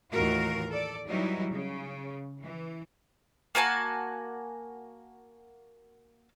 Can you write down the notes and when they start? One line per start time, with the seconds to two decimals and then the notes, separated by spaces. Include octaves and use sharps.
0.12 D#2 A2 E3 F4 F#4 A#4
0.70 A4 D5
1.08 E3 F#3 G3 D#4 E4
1.50 C#3
2.41 E3
3.55 A#3 F#4 G#5 A5